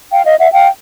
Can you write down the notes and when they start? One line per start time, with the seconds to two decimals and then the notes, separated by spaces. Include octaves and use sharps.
0.11 F5 G5
0.25 D#5 F5
0.39 E5 F#5
0.53 F5 G5